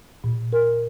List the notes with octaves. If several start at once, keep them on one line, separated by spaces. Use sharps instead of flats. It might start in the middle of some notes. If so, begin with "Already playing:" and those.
A#2
A#4